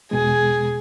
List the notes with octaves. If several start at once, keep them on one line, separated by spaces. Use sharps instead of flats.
E2 B2 G#3 G#4